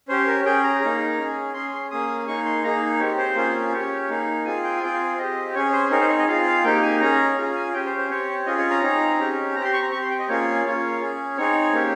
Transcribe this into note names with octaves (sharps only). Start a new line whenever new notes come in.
C#4 G4 C5
A#4
C#4 G#4 G5
A#5
A#3 D#4 G#4
C#4 G#4
C#4 G#4 C6
C6
A#3 C#4 G#4 D#6
A#3 D#4 G#4 C#6
C6
A#3 D#4 G#4 A#5
C4 G4 C#5
C5
A#3 C#4 F4 G#4
C#4 G4 C#5
A#3 D#4 G#4
C4 F4 G#4 G#5
G5
G#5
C4 F4 G#4 G5
C4 G4 D#5
C#4 G#4 C#5
C5
C4 D#4 G#4 A#4
C5
C#5
D#5
C4 F4 G#4 F5
F5
A#3 D#4 G4 G5
G#5
C#4 G#4 A#5
C#4 F4 G#4 A#5
G#5
C#4 G4 G5
C5
C5
C4 G4 C#5
C#4 F4 G#4 D#5
C#5
A#5
C4 D#4 G#4
C#4 G4
C4 A#5
G4 C6
C#6
A#5
C4 G4 C#6
C6
G5
D#5
A#3 C#4 F4 G#4 C#5
A#3 C#4 F4
C#4 G#4
C4 D#4 G#4 C#5
A#3 C#4 G4